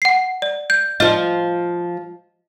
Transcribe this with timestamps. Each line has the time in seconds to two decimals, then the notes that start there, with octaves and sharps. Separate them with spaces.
0.02 F#5 C7
0.42 D5
0.70 G6
1.00 F3 F4 D#5